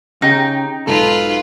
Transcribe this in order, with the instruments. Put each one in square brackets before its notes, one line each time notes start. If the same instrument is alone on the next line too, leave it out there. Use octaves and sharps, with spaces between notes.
[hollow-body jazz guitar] C#3 [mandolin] D#4 [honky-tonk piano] G4 G5
[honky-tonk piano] B1 G#2 [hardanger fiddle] F4 B4 [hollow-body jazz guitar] A4